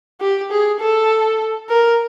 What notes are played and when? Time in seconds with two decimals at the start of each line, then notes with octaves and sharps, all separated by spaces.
0.21 G4
0.51 G#4
0.80 A4
1.69 A#4